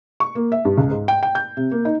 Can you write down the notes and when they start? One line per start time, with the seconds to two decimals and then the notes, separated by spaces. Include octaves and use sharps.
0.20 C#6
0.35 A#3
0.52 E5
0.65 G2
0.78 C#2
0.90 G#2
1.08 G5
1.23 G5
1.35 G6
1.57 C3
1.71 A#3
1.85 D#4